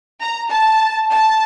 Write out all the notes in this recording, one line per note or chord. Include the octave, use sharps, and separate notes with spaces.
A#5
A5
A5